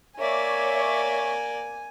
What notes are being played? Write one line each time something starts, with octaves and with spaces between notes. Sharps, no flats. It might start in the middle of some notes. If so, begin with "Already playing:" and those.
A#3 C#5 D5 E5 G#5 C#6